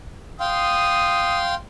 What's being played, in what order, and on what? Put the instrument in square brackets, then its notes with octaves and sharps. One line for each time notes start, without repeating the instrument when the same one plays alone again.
[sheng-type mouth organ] F5 G5 C6 [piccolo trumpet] D#6